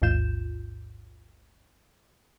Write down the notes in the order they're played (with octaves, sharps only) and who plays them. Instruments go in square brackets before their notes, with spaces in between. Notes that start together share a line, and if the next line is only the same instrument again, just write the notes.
[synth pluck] A1 D#2 G#2 F4 G6 E7